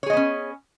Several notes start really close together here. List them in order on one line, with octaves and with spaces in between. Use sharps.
C#5 G#4 D#5 B3 C#4